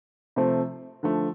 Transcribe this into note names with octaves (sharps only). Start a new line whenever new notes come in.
C3 F3 A3 C4
D3 F3 A3